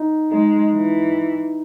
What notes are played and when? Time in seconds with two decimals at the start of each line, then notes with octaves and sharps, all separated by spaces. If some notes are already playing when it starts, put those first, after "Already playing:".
Already playing: D#4
0.31 G#3 D#4
0.73 E3